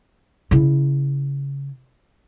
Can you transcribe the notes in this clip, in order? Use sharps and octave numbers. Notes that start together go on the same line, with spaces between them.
C#3 E4